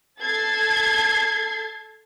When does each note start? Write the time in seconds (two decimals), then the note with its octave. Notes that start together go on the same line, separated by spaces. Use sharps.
0.20 A4 G#6 A6 C7